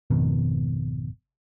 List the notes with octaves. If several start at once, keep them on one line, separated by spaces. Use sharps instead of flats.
G#1 F2 B2 D#3